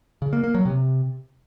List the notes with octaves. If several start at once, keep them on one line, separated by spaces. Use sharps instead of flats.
C#3
A#3
A#3
F#3
C3